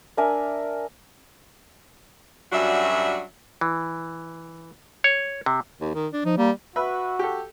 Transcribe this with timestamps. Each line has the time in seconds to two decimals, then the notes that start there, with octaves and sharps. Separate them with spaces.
0.17 D4 A#4 E5 G#5
2.52 F#2 F#3 G3 D4 F#4 E5
3.61 E3
5.04 C#5
5.46 C3
5.81 D#2
5.94 D#3
6.13 D4
6.25 F3 D#4
6.37 G3 A#3
6.76 F#4 B4 E5 B5
7.19 G4 A4